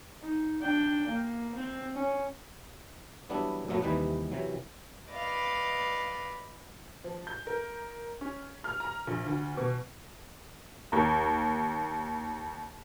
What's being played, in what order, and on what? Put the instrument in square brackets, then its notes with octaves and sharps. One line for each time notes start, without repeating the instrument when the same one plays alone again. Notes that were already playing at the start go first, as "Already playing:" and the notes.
[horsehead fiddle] D#4
D4 G5
A#3
C4
C#4
[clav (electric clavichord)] E3 F#3 G3 B3 D4 E4
F#2 A#2 F#3 A3 B3
D#2 C3 E3 G3 D#4 B4
C3 E3 F#3
[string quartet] B4 D5 D#5 F5
[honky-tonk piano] F3
G6
A#4
C#4
F6
A#5
A#1
D2
B2
D#2 A#5